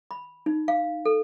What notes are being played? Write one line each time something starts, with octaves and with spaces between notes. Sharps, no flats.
B5
D#4
F5
A4